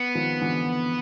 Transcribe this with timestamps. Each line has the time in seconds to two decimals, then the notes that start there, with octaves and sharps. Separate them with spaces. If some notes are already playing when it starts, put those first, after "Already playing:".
Already playing: B3
0.15 D#3 F3
0.41 D3 E3